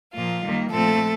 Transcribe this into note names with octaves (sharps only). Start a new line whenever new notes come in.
A#2 F3 A#3 F4
D#3 G3 A#3
A#2 F3 A3 C4 A4